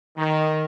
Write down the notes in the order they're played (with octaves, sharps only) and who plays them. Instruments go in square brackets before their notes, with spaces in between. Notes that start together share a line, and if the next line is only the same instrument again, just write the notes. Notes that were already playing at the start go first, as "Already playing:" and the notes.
[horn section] D#3